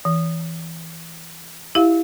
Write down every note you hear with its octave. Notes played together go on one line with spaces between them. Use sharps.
E3
E4 G4 E5 F5